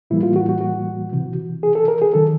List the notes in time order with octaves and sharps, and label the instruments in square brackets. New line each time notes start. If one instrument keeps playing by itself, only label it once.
[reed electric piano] A2 E3 G3 A#3 E4
F4
F#4
F#4
F#4
C2 C3 E3
G#4
A4
A#4
G#4
D#3 F#3 A4